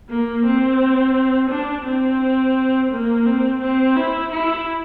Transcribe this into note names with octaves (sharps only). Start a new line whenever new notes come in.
A#3
C4
D4
C4
A#3
C4
C4
E4
E4